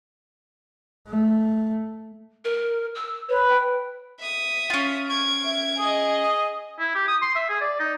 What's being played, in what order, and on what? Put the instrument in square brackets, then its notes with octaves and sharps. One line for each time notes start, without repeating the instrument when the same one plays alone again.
[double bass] A3
[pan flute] A#4
E6
[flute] B4 [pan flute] C#5
[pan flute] G5
[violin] E5 D#6
[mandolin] C#4 F4
[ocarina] C#6 [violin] G#6 D7
[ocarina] E5
[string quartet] G#4 D#5 [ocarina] D#6
[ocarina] D#6
[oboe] E4
G4
D#6
C6
E5
G#4
D5
D#4